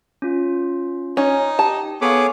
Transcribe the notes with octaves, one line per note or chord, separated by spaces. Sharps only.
C#4 F4
C#4 D#4
G4 A5
B3 G#4 A4 C#5 F5 D6